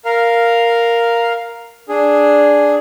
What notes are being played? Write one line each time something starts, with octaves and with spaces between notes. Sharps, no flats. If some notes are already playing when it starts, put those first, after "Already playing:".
A#4 F5
D4 G#4